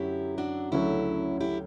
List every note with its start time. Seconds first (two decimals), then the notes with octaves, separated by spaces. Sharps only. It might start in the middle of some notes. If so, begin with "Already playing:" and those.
Already playing: F#2 D3 F#3 E4 G4
0.38 D4 F#4
0.72 D2 C#3 F#3 A3 C#4 E4
1.40 E4 G4